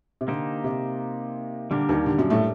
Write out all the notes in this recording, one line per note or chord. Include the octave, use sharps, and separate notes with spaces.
C3
D3 A#3 D#4 G4 C5
C3
D3 G3 A#3 D4 G4 A#4
D#2 D#3
D3
F#2 F#3
A2 A3